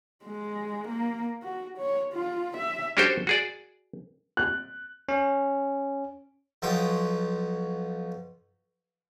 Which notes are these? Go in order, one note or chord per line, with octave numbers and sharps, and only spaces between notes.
G#3
A#3
F#4
C#5
F4
E5
C#4 D4 F#4 G4 A4 C5
F#4 G#4 D5
F#6
C#4
B1 B2 F3 G5 D#6